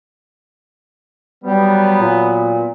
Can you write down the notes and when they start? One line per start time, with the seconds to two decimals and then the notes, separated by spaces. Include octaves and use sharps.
1.44 F#3 G3 B3
1.99 A#2